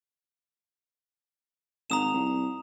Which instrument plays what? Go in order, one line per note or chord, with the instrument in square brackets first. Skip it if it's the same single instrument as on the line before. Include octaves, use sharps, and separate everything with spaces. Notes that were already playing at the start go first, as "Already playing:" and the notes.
[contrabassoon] G#1 [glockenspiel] A#5 D#6 E7
[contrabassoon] C2